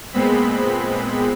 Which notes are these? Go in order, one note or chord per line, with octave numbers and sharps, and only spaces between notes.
A#2 G#3 B3 C4 B5